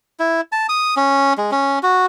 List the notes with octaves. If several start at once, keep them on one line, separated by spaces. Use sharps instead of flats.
E4
A5
D#6
C#4
G#3
C#4
F#4